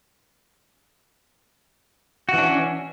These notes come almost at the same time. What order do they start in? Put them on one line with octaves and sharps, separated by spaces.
F#4 E3 D4 C#4